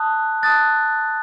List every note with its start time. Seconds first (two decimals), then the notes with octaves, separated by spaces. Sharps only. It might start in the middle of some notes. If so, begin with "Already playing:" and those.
Already playing: A5 D#6 F#6
0.43 A5 D#6 F#6 A6